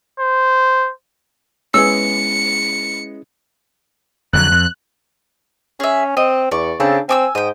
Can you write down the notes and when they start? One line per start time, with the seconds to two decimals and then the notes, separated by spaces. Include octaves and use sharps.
0.20 C5
1.74 G#3 B3 C#4 E4 G#4 E6 C#7
4.33 F2 D3 F#3 F#6
4.52 F2
5.80 C#4 G#4 E5
6.17 C4 D#5
6.51 E2 D5 C#6
6.80 C#3 C4 D4 A4
7.09 C4 G#5 D6 E6
7.35 G#2 G5 D#6